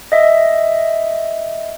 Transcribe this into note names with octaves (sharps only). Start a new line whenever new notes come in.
D#5 E5